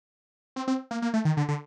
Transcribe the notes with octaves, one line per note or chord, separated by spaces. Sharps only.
C4
C4
A#3
A#3
A3
D#3
D3
D3